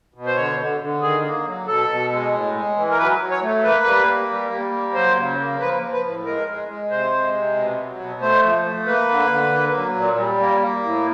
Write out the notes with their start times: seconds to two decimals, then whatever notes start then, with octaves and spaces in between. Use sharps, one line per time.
0.14 B2
0.26 C5
0.36 D3 C#5
0.59 D3
0.81 D3
1.01 D#3 G#4
1.24 A#3
1.45 F#3
1.67 B2 A4
1.89 B2
2.11 G#3
2.32 A2
2.54 G#3
2.76 E3
2.90 A#4
2.98 F#3 B4
3.20 F#3
3.31 C#5
3.42 A3
3.63 A#3 B4
3.85 G3
4.07 A#3
4.29 G3
4.51 G3
4.72 A#3
4.94 F#3 C5
5.16 C#3
5.38 A#3
5.60 F3 B4
5.81 F3
5.92 B4
6.03 A2
6.25 G#3 A#4
6.47 G#3
6.68 G#3
6.90 C3 C5
7.12 G#3
7.33 C3
7.56 B2
7.77 F#3
7.99 B2
8.21 A3 C5
8.43 F3
8.64 A3
8.87 A#3 B4
9.09 D3
9.30 D3
9.52 A#3
9.74 F#3
9.95 A#2
10.17 G3
10.40 A#3
10.61 A#3
10.83 A2